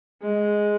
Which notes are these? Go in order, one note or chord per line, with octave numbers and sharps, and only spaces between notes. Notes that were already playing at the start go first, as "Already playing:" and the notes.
G#3